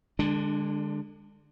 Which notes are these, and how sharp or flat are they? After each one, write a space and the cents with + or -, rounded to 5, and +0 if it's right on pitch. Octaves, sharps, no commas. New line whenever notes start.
D3 +25 G#3 -25 D4 +0